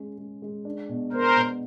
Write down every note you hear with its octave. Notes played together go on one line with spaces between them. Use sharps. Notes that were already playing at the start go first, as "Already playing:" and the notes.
Already playing: G#3 C#4
G#3
G#3
D4
B2
B3 A#4 C5
B2